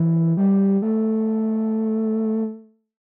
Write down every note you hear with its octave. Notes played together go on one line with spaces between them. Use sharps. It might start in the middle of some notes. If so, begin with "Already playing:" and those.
Already playing: E3
G3
A3